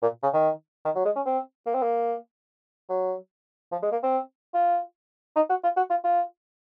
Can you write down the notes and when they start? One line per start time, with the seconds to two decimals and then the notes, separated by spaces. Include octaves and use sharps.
0.03 A#2
0.23 C#3
0.34 D#3
0.85 D#3
0.96 F#3
1.05 G#3
1.16 C#4
1.26 C4
1.67 A#3
1.75 C4
1.83 A#3
2.90 F#3
3.72 F3
3.83 G#3
3.92 A#3
4.03 C4
4.54 F4
5.36 D#4
5.50 F#4
5.64 F4
5.77 F#4
5.90 F4
6.05 F4